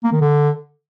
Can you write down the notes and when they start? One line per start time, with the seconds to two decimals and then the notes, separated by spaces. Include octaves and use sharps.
0.04 A#3
0.13 D#3
0.21 D3